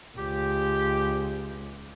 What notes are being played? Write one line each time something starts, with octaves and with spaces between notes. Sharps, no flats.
C#2 G4